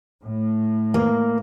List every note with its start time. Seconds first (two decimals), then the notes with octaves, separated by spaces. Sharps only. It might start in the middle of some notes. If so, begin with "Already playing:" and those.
0.23 A2
0.94 A#3